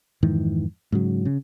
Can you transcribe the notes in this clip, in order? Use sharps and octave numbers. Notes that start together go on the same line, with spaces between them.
F2 G#2 D#3 E3
G#2 C#3 F#3
C#3